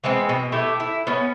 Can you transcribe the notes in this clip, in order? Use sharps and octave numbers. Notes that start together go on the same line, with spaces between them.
E3 G#3 B3 C4
B2
A3 E4 G4
E4
B3 C#4